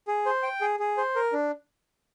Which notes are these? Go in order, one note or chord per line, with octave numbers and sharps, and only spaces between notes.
G#4
C5
G5
G#4
G#4
C5
A#4
D4